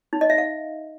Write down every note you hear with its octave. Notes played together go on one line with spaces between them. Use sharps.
D#4
D#5
E5
F5